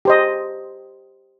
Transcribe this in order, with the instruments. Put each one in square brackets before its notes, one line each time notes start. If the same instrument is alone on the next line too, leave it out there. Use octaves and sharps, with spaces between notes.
[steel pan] G4 C5 D#5